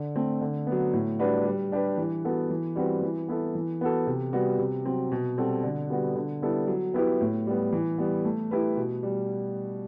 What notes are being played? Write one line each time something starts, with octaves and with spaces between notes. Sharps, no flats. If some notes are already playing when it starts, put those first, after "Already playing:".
Already playing: D3
A3 C4
D3
F#3 B3
A2
G3 D4 F#4 B4
G3
D4 G4 B4
E3
B3 F#4 A4
E3
G3 C4 F#4 B4
E3
B3 E4 A4
E3
B3 F#4 A4
C3
G3 B3 F#4
C3
F#3 C4
B2
G3 C4 F#4 A4
D3
G3 B3 F#4
D3
G3 B3 E4 A4
F#3
B3 E4 G4 B4
A2
G3 B3
E3
G3 B3
A3
E4 G4 B4
B2
G3